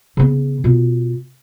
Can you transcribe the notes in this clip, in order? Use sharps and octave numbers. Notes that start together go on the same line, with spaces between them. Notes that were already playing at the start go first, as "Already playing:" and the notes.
C#3 B3
B2 F4